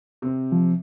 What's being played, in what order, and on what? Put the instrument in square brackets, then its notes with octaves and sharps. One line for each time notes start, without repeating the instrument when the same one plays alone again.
[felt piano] C3 C4
[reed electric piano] F3